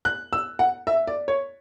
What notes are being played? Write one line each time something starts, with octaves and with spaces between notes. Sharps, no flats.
F#6
E6
F#5
E5
D5
C#5